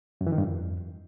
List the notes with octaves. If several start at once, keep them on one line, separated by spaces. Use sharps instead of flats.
F#2
E3
D#3
G2
F2